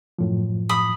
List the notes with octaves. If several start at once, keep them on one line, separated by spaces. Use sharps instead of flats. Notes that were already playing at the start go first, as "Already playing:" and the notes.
F#2 A2 F3
B5 D#6